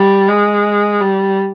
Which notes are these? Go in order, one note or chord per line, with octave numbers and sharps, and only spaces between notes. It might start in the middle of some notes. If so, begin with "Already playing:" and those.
Already playing: G3
G#3
G3